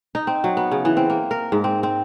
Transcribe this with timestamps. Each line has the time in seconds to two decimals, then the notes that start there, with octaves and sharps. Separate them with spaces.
0.15 D#4
0.27 C4
0.44 F#3
0.57 B3
0.71 C#3
0.85 E3
0.97 C4
1.10 A#3
1.31 A#4
1.52 G#2
1.64 C4
1.83 C4